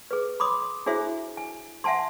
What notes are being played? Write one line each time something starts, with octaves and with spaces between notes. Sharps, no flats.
G#4 B4
B5 C6 D6 D#6
D4 E4 F#4 G#4 C5 E5
G#5
E5 F#5 G#5 A5 C6